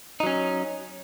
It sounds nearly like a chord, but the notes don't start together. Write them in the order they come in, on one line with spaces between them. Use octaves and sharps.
D#4 F#3 C#4